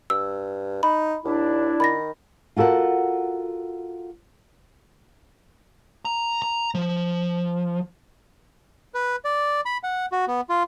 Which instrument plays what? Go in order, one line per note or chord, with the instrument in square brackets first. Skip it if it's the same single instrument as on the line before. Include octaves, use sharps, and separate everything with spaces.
[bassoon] G2 [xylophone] E6
[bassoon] D#4 [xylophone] B5
[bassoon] D#2 [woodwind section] D4 E4
[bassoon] D#3 [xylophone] B5 A6 A#6
[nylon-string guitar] F4 F#4 A4 A#4 F#5
[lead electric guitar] A#5
A#5
F3
[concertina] B4
D5
B5
F#5
F#4
B3
F4